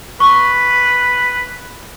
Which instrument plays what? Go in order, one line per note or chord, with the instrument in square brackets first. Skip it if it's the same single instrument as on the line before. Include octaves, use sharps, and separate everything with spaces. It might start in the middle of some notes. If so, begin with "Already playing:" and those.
[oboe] B4 [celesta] C#6